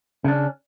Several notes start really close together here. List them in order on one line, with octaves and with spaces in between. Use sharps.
C#3 D4 C#4